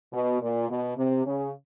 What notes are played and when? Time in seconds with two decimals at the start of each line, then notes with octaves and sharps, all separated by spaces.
0.12 B2
0.41 A#2
0.69 B2
0.97 C3
1.26 C#3